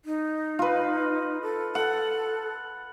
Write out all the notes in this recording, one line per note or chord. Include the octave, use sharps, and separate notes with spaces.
D#4
F4 B4
A4
A4 F#5